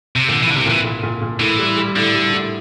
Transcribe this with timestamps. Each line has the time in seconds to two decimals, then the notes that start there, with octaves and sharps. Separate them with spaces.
0.16 C3
0.28 A#2 D3
0.43 E3
0.47 C2 D3
0.56 C3
0.66 A#2 E3
0.85 A#2
1.03 A#2
1.22 A#2
1.40 A2 E3
1.58 G3
1.77 G3
1.96 A2 D3
2.15 G3
2.33 A2